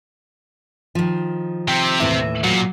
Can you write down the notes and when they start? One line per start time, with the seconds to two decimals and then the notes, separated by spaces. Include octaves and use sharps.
0.95 D#3 F3
1.68 C3 C4 G5
2.00 D#2 A2 E3 E5
2.44 A#2 F#3